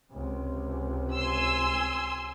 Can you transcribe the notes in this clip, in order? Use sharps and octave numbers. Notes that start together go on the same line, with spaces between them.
C#2 C3
G#5 C6 E6